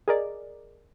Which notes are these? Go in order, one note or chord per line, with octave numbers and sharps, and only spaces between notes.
G#4 A#4 D5 D#5